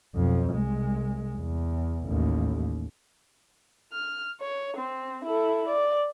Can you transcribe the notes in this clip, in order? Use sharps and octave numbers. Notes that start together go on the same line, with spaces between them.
B1 F2
C2 G#3
E2
A1 D#2
F6
C#5
C4
E4 A4
D5